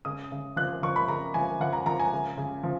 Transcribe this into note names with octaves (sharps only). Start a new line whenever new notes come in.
C#3 D#6
C#3
F3 F#6
F3 C#6
B5
C#3 A#5
F3 G#5
F3 F#5
A#5
F3 A#5
G#5
C#3
C#3
F3